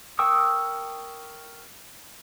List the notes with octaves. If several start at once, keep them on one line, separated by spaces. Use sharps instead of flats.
A#4 G5 C#6 D#6 E6